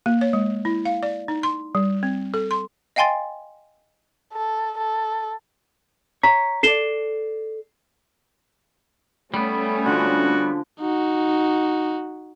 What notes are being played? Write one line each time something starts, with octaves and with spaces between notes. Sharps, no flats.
A#3
C#5
G#3
E4
F5
D5
D#4
C6
G3
C4
A4
C6
D#5 F5 G5 G#5 C6 A6
A4
A4
C#5 A#5 B6
A4 D5 C7 E7 G7
G3 A3 B3 C#4
D3 F3 F#4
D#4 F#4